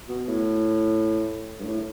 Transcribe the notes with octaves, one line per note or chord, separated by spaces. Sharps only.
B2
A2
G2
A2